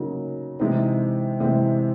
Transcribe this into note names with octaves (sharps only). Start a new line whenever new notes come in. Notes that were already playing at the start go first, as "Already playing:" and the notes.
Already playing: C#3 F#3 A#3 D#4
C3 E3 G#3 C4 D#4
C3 E3 G#3 C4